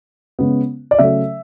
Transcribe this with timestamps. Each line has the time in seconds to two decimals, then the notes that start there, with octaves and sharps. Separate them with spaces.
0.39 C#3 G#3 B3
0.91 D5
0.99 C#3 F#3 A3 E5